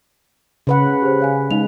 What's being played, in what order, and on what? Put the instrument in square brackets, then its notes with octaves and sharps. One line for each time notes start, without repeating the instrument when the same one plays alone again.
[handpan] C#3 B4 F#5
[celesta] G4 C5
C#5 F5 G#5
[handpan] G#3 [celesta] D#4 F5 F7